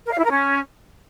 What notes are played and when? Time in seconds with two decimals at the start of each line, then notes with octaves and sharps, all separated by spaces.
0.06 A#4
0.12 F5
0.18 E4
0.24 A#4
0.30 C#4